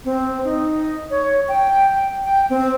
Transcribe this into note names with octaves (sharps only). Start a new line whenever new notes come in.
C4
D#4
C#5
G5
G5
C4